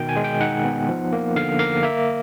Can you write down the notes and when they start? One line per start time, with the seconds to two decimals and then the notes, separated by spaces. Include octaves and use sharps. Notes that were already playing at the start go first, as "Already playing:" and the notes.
Already playing: B2 D#3 G5
0.09 G#5
0.16 G#3
0.24 G5
0.40 D#4 F#5
0.64 B3
0.89 F3
1.13 A#3
1.36 D3 F5
1.59 A#3 F5
1.83 A#3 E5